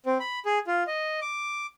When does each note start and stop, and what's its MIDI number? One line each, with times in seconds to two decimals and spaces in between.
0.06 0.18 60
0.20 0.39 83
0.45 0.59 68
0.67 0.84 65
0.87 1.20 75
1.21 1.67 86